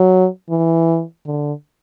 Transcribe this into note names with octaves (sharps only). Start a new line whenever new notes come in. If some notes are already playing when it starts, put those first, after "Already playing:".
Already playing: F#3
E3
D3